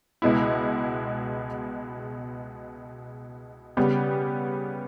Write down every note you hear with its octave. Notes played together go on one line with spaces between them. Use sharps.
C#2 B2 G#3 B3 E4
C#3 G3 B3 G4